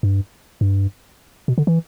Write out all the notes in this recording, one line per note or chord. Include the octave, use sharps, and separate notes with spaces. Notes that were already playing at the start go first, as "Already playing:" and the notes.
G2
G2
B2
D3
E3